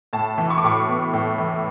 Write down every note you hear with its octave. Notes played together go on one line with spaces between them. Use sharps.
A2 A5
E3
C#6
D6
A2 C#6
B3
A2
E3